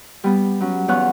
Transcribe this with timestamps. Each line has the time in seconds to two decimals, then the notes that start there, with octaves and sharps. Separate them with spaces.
0.24 G3 B3
0.60 F#3 C#4
0.88 E2 B3 C#5 F5 F#5 F#6